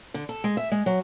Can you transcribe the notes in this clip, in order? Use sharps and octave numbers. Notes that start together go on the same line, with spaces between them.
D3
A4
G#3
E5
G#3
F#3